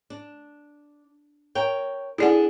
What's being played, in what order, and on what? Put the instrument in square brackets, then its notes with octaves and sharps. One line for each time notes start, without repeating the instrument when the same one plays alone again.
[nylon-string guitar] D4
A#4 C#5 G5
[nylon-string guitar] D4 G#4 A4 [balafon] E4 D5 F#5